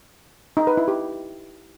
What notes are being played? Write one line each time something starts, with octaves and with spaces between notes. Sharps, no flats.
D#4
B4
E4
G4